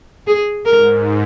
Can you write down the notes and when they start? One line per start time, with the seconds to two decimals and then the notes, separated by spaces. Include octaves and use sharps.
0.27 G#4
0.65 G#2 A#4